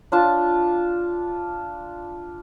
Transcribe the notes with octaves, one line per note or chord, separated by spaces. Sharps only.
D4 F4 A5